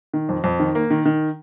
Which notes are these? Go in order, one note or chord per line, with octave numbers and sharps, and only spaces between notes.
D#3
F2
F2
D#3
A#3
D#3
D#3